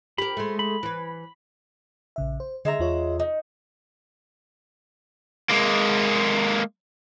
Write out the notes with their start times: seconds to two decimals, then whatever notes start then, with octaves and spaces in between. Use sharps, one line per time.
0.18 G4 A#4 B5
0.37 G#3 A3
0.59 B5
0.83 E3 B4
2.16 A#1 C#3 E5
2.40 C5
2.65 D3 G#3 E5 A#5
2.79 E2 F4 C#5
3.20 D#4
5.49 G#3 A#3